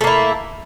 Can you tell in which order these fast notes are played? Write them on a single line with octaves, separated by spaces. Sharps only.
A3 A#3 E4